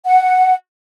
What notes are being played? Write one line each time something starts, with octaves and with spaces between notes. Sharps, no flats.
F#5